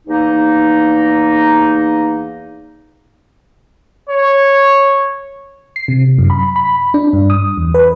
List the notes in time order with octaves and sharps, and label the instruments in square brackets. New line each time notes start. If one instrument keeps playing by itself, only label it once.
[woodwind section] E2 A#3 D#4
[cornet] C#5
[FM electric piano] C7
C3
F#2
B5
B5
D4
G2
D#6
E2
B4